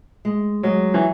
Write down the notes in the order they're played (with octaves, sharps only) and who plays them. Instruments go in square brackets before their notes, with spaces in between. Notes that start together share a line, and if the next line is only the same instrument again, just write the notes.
[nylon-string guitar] G#3
[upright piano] F#3 [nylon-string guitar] G#3
[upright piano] E3